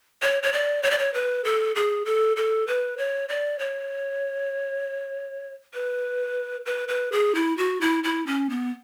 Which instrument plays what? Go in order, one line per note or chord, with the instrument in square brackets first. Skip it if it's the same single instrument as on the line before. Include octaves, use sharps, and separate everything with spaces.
[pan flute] C#5
C#5
D5
C#5
D5
C#5
B4
A4
G#4
A4
A4
B4
C#5
D5
C#5
B4
B4
B4
G#4
E4
F#4
E4
E4
C#4
B3